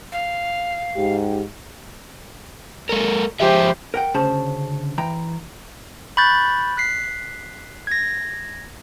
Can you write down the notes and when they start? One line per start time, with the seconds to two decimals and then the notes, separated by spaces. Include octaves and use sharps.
0.12 F5
0.97 G#2 G4
2.89 G#3 A4 A#4
3.40 F3 G#3 G4 C5 E5
3.94 A#4 F#5 G5
4.14 D2 C#3 C#4 G#4 C5 A5
4.98 E3 G5 A#5
6.17 B5 C#6 F#6 G6 A6
6.77 F#6 B6 C7
7.87 G#6 A#6